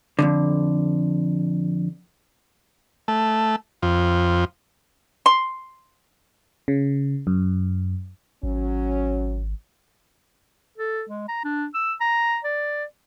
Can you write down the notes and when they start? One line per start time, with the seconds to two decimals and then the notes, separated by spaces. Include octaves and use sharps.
0.19 F2 G#2 D3
3.08 A3
3.82 F2
5.26 C6
6.68 C#3
7.27 F#2
8.43 G#1 F#3 C#4
10.78 A4
11.09 G#3
11.28 A#5
11.44 D4
11.74 E6
12.01 A#5
12.44 D5